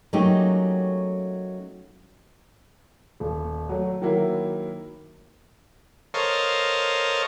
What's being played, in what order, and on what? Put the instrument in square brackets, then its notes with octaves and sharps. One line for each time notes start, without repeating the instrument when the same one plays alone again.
[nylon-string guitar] F#3 A3 A#3 C#4 D#4 G4
[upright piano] D#1
F#3 A3
D#3 F#3 A#3 E4
[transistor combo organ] A4 A#4 C5 C#5 D#5 F5